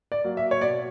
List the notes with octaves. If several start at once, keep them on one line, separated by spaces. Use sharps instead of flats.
D5
F#3 A#3
E5
C#5
B2 D5